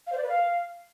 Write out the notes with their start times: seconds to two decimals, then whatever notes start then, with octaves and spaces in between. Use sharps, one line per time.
0.07 F5
0.12 C5
0.18 D5
0.23 B4
0.29 F5